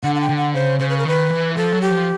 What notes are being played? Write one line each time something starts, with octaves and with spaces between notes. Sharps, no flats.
D3 F#5
F#5
G5
D3
F#5
C#3 C5
C#3 C5
B4
A#4
D#3 B4
E3
F3 A4
F#3
G4
F3